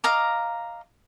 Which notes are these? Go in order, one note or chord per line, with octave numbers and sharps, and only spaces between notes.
D#5 F5 A#5 D6